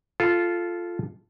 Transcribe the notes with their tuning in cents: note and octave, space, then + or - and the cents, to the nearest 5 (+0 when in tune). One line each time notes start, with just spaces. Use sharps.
F4 -5 A4 -10